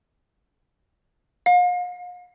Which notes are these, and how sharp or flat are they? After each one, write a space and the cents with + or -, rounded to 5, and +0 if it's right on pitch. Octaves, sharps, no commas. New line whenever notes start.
F5 +40